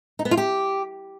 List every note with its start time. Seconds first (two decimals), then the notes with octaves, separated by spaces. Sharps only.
0.19 D#4
0.25 B3
0.31 F4
0.37 G4